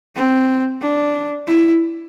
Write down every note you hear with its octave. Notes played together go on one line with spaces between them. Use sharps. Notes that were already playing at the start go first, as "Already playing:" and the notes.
C4
D4
E4